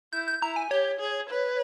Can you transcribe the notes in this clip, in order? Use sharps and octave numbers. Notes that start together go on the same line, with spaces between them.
E4 G6
G6
E4 A#5
G#5
G4 C#5
G#4
B4